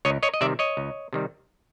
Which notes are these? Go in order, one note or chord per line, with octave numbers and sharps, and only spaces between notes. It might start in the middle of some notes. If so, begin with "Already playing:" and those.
C#2 C#5 D#5
C#5 D#5
D#5
C3 D#3 G3 D5 E5
C#5 D#5
C#2
C3 D#3 G3